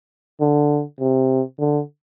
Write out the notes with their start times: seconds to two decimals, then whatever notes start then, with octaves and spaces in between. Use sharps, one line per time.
0.40 D3
1.00 C3
1.59 D3